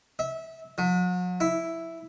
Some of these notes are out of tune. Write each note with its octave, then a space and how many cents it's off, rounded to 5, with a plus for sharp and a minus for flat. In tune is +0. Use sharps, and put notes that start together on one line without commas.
E5 -20
F#3 -40
E4 +0